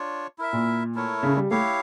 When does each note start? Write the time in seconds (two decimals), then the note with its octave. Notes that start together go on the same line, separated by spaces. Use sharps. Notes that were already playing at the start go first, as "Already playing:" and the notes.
Already playing: D4 F4 C#5
0.38 E4 A#4 E5
0.53 A#2
0.95 A3 E4 A#4 C#5
1.23 C#3
1.37 G3
1.51 A3 E4 G4 C#5 F5